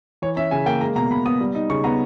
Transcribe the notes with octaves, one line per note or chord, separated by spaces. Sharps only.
E3 C#5
C#4 E5
C#3 G#5
A#3 G5
G#3 A#5
B2 A#5
B2 B5
B3 D#6
G3
D#4
C#3 C#6
B3 A#5